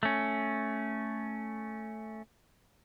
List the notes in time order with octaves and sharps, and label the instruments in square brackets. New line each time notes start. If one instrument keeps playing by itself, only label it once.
[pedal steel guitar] A3 C#4